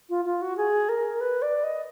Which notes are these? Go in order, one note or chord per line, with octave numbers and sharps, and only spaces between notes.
F4
F4
F#4
G#4
A#4
B4
D5
D#5